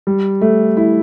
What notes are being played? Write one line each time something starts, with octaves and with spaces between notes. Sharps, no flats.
G3
A3
E4